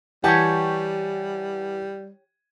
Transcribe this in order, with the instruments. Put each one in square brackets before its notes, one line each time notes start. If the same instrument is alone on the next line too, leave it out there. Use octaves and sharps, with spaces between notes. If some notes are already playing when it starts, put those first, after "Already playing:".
[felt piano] E3 [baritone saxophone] G3 [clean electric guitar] G4 C#5 [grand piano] F#5 G#5 A5